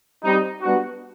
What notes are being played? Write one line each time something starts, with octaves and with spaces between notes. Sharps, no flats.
G3 C4 D#4
G3 B3 D4 F#4